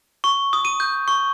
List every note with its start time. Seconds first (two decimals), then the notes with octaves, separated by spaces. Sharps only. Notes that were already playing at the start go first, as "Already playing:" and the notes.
0.24 C#6
0.53 D#6
0.65 D#7
0.80 G6
1.08 C#6